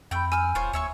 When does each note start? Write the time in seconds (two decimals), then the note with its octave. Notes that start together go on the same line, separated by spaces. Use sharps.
0.11 F2 A3 G5 B5 G6
0.32 G#5 E6 F6
0.55 D#1 F4 C5 C#5
0.73 D#2 C#5 E5 C#6